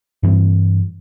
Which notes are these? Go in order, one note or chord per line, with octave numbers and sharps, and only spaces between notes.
G2 E3 C4